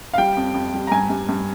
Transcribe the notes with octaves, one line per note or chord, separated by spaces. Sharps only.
F5
G3 G5
F2
F2
G3
A#5
G2 G#5
G2
G2